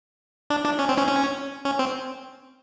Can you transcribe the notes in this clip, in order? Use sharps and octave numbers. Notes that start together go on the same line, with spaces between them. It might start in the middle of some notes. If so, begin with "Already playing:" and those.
D4
D4
C#4
C4
C#4
C#4
C#4
C4